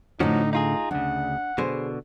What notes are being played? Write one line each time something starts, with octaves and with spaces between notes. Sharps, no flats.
A2 D3 F3 C#4 D#4 F#4
D#4 F4 G#4 A#5
D2 C#3 D4 F#5
B2 D3 G#4 C5